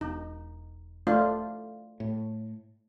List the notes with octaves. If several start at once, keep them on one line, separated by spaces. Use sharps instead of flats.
E1 D#4
A3 D4 F4
A2